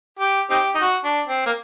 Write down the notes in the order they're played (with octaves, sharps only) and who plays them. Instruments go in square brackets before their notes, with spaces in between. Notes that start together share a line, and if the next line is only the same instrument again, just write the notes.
[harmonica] G4
C4 D#4 G4
D#4
F#4
D4
C4
A#3